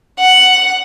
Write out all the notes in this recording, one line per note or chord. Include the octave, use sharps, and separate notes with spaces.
F#5